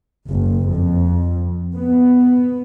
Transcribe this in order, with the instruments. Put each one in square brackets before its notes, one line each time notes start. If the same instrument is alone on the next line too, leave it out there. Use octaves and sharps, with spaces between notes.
[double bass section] F#1
F2
B3